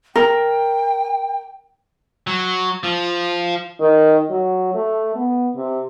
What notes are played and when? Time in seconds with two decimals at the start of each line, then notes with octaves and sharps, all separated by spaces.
0.16 A#4 G5
2.27 F#3
2.83 F3
3.80 D#3
4.30 F#3
4.74 A3
5.16 B3
5.56 C3